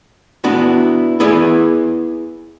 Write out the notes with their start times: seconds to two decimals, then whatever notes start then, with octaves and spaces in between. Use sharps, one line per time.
0.44 B3 D4 E4 F#4
1.20 B3 E4 G#4 B4 D5